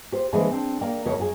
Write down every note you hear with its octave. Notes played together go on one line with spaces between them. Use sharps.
G4 C5
D3 E3 G#3 A#3 G#4 C5
C4 D4
A#3 A#4 D5 G5
F2 C#3 A3 A#4 C#5
F#2 F#4 G#4